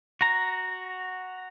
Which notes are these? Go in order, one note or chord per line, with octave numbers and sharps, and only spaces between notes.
F#4 A#5